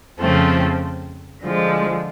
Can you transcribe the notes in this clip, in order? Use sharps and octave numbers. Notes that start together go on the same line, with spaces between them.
F2 C#3 F3 A3 C4
D3 F3 G#3